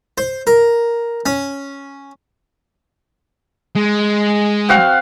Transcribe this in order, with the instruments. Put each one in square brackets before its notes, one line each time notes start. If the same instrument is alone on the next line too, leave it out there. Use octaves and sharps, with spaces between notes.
[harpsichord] C5
A#4
C#4
[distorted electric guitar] G#3
[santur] C4 F#4 F5